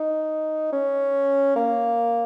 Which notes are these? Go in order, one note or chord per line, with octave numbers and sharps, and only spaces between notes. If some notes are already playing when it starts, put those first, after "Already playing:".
Already playing: D#4
C#4
A#3